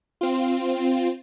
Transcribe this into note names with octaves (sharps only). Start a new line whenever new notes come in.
C4 F4